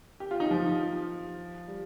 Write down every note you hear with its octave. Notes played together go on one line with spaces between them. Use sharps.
G4
F4
D#4
F3
G3